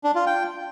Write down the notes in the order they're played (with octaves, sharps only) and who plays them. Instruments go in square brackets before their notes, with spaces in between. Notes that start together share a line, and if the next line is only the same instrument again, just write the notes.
[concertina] D4
F4
G5